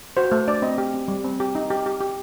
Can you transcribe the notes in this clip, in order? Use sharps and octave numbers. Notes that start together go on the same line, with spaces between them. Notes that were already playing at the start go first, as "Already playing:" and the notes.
F#4 C5
A3 C5
D4 D5
C4 D#5
G4
C4
G3
C4
G4
D#4
G4
G4
G4